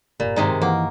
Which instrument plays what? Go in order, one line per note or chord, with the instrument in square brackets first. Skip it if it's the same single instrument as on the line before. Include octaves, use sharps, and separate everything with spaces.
[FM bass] F1 [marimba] G2 [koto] A#2
[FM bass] G#2 [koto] C3 D#3 G#3 [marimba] A#5
[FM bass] E3 [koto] A#3 [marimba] F#5